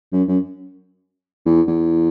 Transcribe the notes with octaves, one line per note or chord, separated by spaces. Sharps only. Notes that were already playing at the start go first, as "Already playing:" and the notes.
F#2
F#2
E2
E2